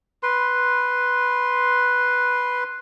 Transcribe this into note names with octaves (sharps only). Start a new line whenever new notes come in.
B4 C6